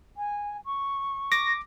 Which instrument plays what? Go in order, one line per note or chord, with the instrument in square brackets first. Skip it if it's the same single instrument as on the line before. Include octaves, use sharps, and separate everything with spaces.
[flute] G#5
C#6
[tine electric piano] D6 [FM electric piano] A#6